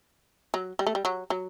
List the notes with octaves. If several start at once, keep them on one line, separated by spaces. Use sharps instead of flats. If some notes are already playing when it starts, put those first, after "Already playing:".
F#3
G3
A3
G3
F#3
F#3